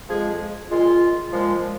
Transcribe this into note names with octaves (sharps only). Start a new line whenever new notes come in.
F2 F3 G#3 G#4
A#2 G#3 F4
A#2 F3 G#3